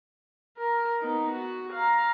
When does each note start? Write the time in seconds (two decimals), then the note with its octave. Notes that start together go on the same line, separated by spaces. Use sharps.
0.58 A#4
1.00 B3 D#4
1.32 F#4
1.73 F5 A#5